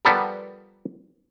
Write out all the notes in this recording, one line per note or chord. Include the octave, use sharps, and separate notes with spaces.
F3 G3 B3 A4 A#4